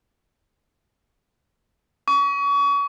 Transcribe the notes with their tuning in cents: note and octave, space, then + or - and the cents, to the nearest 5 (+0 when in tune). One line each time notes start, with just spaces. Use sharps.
C#6 +35